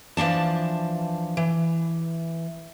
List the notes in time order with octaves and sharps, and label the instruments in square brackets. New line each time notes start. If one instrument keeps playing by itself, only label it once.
[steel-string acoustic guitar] E3 F3 D4 A5
E3